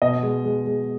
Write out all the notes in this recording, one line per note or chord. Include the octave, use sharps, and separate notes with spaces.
B2 D#5
G#3
G#3
G#3